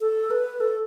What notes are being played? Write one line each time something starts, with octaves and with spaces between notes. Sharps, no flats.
A4
B4
A4